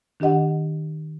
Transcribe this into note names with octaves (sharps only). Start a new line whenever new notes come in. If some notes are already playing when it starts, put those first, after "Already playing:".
D#3 D4 G4 D#5 F#5